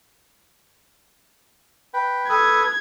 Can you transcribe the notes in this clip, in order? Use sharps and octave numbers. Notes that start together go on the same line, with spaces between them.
B4 G5
A4 B4 D#6 G#6